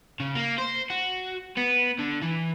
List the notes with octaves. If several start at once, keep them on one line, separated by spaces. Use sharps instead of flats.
C#3
A#3
C5
F#4
B3
D3
E3